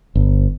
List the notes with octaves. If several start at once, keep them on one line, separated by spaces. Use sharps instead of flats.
G1